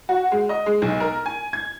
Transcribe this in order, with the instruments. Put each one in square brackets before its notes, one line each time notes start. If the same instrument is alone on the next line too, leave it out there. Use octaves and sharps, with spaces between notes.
[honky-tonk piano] F#4
G#3
D#5
G#3
B1
A#4
G#5
G#6